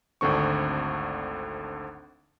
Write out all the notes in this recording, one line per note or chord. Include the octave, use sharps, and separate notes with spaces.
G#1 D2 D3 C4 C#6